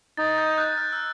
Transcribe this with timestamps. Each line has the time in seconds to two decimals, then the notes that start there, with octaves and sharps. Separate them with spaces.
0.17 D#4 A6
0.38 G6
0.58 F#6
0.78 F6
0.92 E6